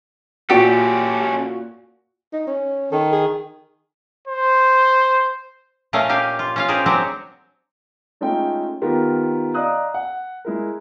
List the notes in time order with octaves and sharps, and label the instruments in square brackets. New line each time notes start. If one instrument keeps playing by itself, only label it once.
[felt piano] A#2 F#4 D7 [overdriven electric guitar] C#4 A4 [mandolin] G4 D5
[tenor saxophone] D#4
C#4
[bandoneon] D#3 [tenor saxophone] A4
[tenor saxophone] G#4
[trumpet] C5
[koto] A#2 A3 C#4 A#4 D#5 F5
A#3 G4 F5 G#5
F4
C#4 F4 F5
G4 G#4 A#4 C5 D5
F#3 G#3 C4 D4 F#4 G4
[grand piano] G#3 A3 C#4 D#4 F4 G5
D#3 B3 F4 G4 A#4
D5 D#5 F5 A#5 D#6 F#6
F#5
G#3 E4 A#4